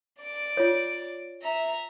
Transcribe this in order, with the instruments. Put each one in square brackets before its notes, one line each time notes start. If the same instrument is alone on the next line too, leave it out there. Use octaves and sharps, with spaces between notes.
[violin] D5 D6
[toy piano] F4 C#5
[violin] E5 A#5